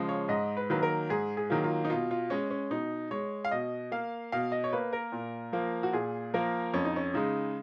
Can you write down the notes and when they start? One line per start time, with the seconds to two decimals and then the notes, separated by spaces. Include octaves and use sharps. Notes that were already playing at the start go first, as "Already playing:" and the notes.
Already playing: C#3 F3 G#3
0.09 C#5
0.29 G#2 D#5
0.57 B4
0.70 D#3 F#3 A#3 B4
0.83 A#4
1.09 G#2 G#4
1.37 G#4
1.50 D#3 F#3 A#3
1.64 F4
1.85 D#4
1.90 B2 F4
2.11 F4
2.30 G#3 C#4
2.50 C#4
2.71 B2 D#4
3.11 G#3 C#5
3.45 F5
3.51 B2 D#5
3.92 A#3 F5
4.32 B2 F5
4.52 D#5
4.64 C#5
4.73 A#3 B4
4.93 A#4
5.12 A#2
5.53 F3 A#3
5.83 F#4
5.93 A#2 G#4
6.34 F3 A#3 A#4
6.74 F2 C#4
6.85 D#4
6.96 C#4
7.14 C#3 G#3 D#4